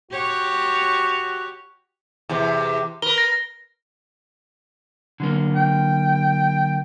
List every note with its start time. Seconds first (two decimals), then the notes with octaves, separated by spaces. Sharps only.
0.11 F#4 G4 C#5
2.29 E2 C3
3.02 A#4 B4 G7
3.18 A#6
5.20 D3 F#3 A#3
5.55 G5